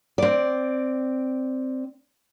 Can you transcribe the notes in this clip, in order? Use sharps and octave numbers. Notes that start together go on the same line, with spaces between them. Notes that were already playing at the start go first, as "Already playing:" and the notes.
C4 D5